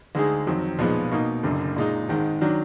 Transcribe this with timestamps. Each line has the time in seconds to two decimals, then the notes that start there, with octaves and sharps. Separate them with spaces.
0.15 D2 D3 G#3 D#4 G#4
0.47 F2 D#3 F#3
0.79 B1 A#2 F3 G#3 B3
1.11 B2 A#3 D#4
1.44 F#1 F#2 D3
1.76 A#2 G#3 D#4
2.09 G#1 G#2 D#3 G#3
2.41 D#3 F#3 D4